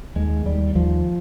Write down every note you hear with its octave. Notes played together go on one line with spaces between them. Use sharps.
D#2 G#3
D#2 G3
D#2 F3